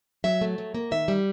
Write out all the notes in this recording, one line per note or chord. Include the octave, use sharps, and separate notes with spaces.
F#3 E5
A3
F#3
A#3
D#3 E5
G3